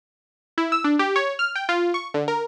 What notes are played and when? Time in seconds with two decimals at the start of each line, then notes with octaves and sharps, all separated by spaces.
0.58 E4
0.72 E6
0.84 D4
0.99 G4
1.16 C#5
1.39 F6
1.56 G5
1.69 F4
1.94 C#6
2.14 D3
2.28 A#4